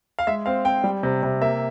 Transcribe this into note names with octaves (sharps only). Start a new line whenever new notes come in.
F5
G#3 E5
C4 F5
C4 G5
G3
C3
C3
A#3 E5